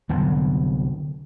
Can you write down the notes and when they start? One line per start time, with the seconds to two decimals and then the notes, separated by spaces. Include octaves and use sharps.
0.09 C2 D3 F#3 B3